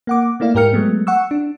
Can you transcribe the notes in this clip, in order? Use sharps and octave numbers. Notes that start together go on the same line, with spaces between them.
A#3 F#5 D6
A3 A#3 E4 D5 F5
G#2 G4 A#4 G5 F6 C#7
F#3 G#3 A3 B3
F#5 C#6 E6
D4